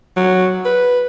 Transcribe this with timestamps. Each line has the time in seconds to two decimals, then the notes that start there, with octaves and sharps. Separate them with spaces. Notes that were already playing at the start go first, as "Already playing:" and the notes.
0.16 F#3
0.65 B4